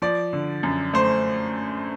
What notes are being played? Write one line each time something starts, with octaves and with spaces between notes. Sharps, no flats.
F3 D5
D3
F#2
A3 C5